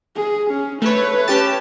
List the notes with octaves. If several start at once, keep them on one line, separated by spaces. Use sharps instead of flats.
G#4
C#4
A3 B4 C#5
C#4 G4 A5